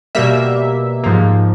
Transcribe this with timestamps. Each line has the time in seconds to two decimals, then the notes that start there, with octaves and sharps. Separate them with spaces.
0.15 B2 G3 A#3 E5
1.04 G#2 F3 A#3